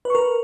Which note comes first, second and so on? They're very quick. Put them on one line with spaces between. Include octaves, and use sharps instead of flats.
B4 C#6 A#4